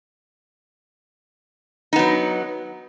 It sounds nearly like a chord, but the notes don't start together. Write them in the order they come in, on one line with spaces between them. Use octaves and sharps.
D#4 B3 F#3